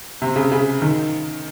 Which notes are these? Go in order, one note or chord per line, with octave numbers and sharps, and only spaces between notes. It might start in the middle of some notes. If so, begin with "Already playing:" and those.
C3
C#3
C#3
D#3